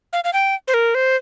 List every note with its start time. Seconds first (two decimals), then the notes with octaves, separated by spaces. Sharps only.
0.13 F5
0.24 F5
0.33 G5
0.68 C5
0.74 A#4
0.95 C5